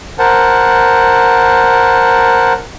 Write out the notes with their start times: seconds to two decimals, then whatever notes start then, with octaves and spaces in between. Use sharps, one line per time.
0.19 A#4 C5 F#5 A5